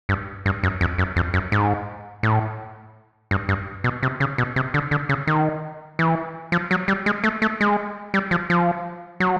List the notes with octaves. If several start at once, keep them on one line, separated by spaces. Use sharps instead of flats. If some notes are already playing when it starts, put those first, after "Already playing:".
G2
G2
F#2
F2
F#2
F2
F#2
G#2
A2
G2
G2
B2
C3
C#3
B2
C3
D3
D3
C#3
D#3
E3
F3
F#3
G3
G#3
A3
A3
G#3
G3
F3
F3
F#3